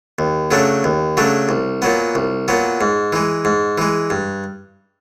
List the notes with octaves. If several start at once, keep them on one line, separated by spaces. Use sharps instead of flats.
D#2
C#3 F#3 A3 D4
D#2
C#3 F#3 A3 D4
C2
A#2 F#3 B3
C2
A#2 F#3 B3
G#2
E3 G#3
G#2
E3 G#3
G2